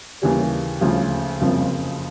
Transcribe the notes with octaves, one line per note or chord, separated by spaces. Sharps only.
D#2 C#3 E3 G3
D2 C#3 F3
F#1 F2 C#3 F3